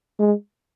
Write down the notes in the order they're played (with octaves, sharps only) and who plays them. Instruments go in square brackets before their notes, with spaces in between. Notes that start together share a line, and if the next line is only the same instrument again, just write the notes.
[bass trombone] G#3